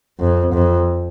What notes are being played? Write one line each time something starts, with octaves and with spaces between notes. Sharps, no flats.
F2
F2